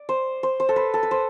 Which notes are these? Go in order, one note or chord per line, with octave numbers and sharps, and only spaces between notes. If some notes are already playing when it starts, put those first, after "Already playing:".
Already playing: D5
C5
C5
C5
A4
B4
A4
B4
C5